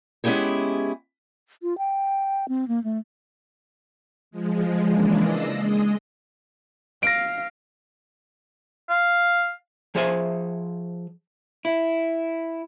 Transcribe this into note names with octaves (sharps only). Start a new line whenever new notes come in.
G#3 B3 C#4 E4 G4 G#4
F4
G5
C4
A#3
A3
F3 G#3
C#3 E3 G#3 A#3 D4
D5 D#5 E6 A#6 C7
G#3 D#5
F5 A#6 D7
F5
F3 G#4 C5 E5 G#5
E4